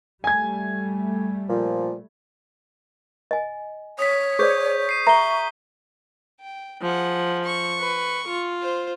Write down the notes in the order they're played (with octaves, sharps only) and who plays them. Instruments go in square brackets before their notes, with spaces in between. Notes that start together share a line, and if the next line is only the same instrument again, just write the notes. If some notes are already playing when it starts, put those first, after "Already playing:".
[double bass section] G3 A3 [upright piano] G#5 G#6
[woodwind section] A#2 F3
[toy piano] D#5 G#5
[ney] C#5 [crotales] D#6 B6
[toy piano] G#4 C5 D5 [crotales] C#6 G6 B6
[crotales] C7 D#7
[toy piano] E5 A#5 [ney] C#6 [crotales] C7 G7
[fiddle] G5
[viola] F3 [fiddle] G#4 F#5
[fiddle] C#6
[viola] B4
F4
[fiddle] C5